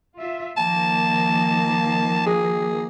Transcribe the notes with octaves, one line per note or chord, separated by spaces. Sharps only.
F4 E5
D#3 F3 A#3 A5
G#4